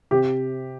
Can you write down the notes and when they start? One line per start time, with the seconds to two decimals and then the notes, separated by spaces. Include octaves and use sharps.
0.11 C3 G4